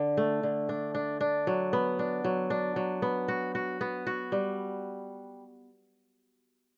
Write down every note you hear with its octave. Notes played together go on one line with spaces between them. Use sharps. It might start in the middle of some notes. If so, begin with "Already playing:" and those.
Already playing: D3
A3
D3
D4
D4
D4
F#3
B3
D4
F#3
D4
F#3
B3
F#4
F#4
B3
F#4
G3